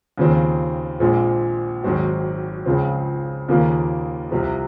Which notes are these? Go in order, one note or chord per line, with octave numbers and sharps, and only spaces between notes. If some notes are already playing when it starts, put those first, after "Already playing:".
D#2 C#3 F3 C4
A#1 A#2 F3 G#3 C4
G#1 G#2 F#3 C4 F#4
C#2 C#3 F3 C4
D#2 C#3 F3 A#3
C2 C3 F3